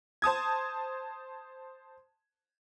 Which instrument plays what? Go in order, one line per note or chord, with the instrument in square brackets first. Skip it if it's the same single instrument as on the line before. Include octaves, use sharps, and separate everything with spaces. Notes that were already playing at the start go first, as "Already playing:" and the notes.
[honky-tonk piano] C5 A5 D#6 G#6